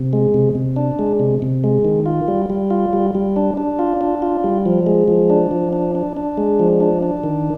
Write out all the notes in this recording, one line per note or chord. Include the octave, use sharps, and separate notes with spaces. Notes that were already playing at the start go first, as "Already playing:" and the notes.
Already playing: C3
G#3
C3
C3
D4
G#3
C3
C3
G#3
D#3
F4
G3
G3
F4
G3
G3
D4
D4
F4
D4
F4
G3
F3
G#3
F3
D4
F3
D4
D4
D4
G#3
F3
D4
D4
D#3